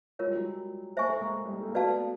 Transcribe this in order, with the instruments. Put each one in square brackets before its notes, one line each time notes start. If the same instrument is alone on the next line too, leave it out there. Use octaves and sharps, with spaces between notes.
[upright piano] G#3 [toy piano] F4 A#4 C#5
[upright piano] G3
F#3 G#3
[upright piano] A#3 [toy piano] C5 E5 G#5 C#6
[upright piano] A3
G#3 A#3
G3
G#3
A3
A#3
[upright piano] A3 B3 [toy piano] F#4 B4 D5 F5 A5